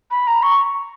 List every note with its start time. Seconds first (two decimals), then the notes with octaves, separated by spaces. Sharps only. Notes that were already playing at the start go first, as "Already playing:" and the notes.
0.10 B5
0.27 A#5
0.42 C#6